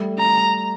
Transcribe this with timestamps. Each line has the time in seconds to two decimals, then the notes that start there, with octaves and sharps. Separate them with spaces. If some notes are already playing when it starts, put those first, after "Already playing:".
Already playing: G3 A3
0.19 A#5